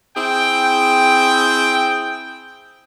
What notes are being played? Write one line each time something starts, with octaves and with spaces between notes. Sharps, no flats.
C4 E4 G#4 G5